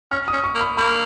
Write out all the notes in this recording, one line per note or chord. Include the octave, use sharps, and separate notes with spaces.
C#4 F6
D#6
C#4
C#6
A#3
B5
A#3 B5